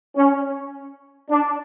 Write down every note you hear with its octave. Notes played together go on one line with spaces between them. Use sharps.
C#4
D4